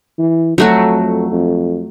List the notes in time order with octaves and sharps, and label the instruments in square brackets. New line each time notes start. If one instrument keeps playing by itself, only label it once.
[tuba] E3
[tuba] F2 [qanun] F#3 A3 F#4
[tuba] F2